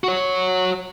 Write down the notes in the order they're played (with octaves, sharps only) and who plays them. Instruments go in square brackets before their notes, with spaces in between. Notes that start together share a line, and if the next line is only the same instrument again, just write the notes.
[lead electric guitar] F#4 C#5